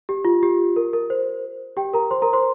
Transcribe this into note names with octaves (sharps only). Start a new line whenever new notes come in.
G4
F4
G4
A#4
A#4
C5
G4 G5
A#4 A#5
C5 C6
A#4 A#5
C5 C6